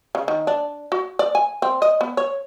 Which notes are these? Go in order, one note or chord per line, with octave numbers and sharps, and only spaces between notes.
C#3
D#3
D4
F#4
D5
G#5
C4
D#5
B3
C#5